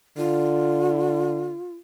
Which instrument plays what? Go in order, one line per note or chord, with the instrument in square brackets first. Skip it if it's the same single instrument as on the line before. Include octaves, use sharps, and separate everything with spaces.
[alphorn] D3 [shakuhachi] F4